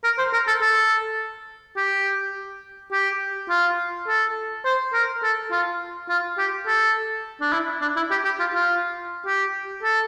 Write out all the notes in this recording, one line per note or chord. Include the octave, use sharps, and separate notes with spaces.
A#4
C5
A#4
A4
A4
G4
G4
F4
A4
C5
A#4
A4
F4
F4
G4
A4
D4
E4
D4
E4
G4
G4
F4
F4
G4
A4